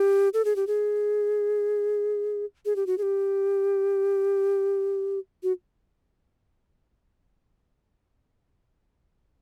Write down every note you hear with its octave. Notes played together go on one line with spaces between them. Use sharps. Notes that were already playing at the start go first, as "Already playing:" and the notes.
Already playing: G4
A4
G#4
G4
G#4
G#4
G4
F#4
G#4
G4
F#4